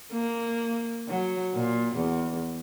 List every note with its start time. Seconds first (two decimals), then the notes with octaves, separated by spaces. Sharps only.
0.12 A#3
1.09 F#3
1.54 A#2
1.96 E2